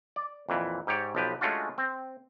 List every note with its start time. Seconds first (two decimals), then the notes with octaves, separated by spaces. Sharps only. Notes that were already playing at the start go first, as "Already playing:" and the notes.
0.16 D5
0.49 F2 A#2 E3
0.87 G#2 G4 C#5 D5
1.15 B1 F3 G4 B4
1.41 G#3 A3 C#4 D4 F4 F#4
1.78 C4